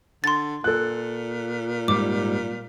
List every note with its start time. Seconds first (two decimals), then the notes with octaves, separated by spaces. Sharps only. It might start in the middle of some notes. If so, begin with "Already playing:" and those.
0.24 D3 C6 A6
0.64 A#2 A4 F#6
1.88 G#2 G3 D6